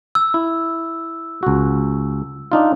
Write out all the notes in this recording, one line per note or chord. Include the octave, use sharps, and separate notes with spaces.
E6
E4
C#2 F#4
D4 D#4 F4